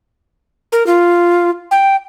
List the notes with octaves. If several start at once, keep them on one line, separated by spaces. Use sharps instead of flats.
A#4
F4
G5